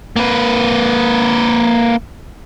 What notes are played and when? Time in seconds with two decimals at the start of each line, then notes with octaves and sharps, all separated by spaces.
0.16 A#3 B4